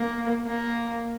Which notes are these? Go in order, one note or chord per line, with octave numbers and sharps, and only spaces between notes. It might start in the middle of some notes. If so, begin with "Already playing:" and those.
Already playing: A#3
A#3